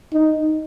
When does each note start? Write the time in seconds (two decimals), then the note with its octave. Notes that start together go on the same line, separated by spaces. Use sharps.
0.13 D#4